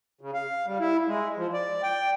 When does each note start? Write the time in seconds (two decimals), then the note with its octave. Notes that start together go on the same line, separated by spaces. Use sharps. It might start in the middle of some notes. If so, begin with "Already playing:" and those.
0.21 C#3
0.34 F5
0.66 G3
0.80 E4
1.07 G#3
1.37 F3
1.54 D5
1.83 G5